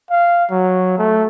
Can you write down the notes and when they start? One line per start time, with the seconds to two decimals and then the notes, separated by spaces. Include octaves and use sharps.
0.10 F5
0.50 F#3
0.98 A3